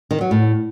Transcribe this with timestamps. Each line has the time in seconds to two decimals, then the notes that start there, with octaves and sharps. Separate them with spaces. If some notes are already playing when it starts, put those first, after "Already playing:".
0.11 D#3
0.21 F#3
0.31 A2